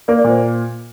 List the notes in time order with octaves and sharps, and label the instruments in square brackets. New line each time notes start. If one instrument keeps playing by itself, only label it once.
[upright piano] A#3 [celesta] A#4 D5
[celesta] A#4 D5
[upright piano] A#2 [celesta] C5